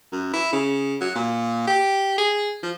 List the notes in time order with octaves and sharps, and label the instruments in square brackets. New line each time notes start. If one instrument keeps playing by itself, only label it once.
[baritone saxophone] F#2
E4
C#3
F#3
A#2
G4
G#4
F3